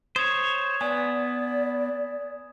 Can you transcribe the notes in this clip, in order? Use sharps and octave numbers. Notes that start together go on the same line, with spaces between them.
C5 C#5 D#6 G#6 E7
B3 D5 G#5 D#6